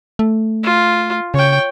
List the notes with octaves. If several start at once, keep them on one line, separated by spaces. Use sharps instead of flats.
A3
F4
C#3 C#5 G5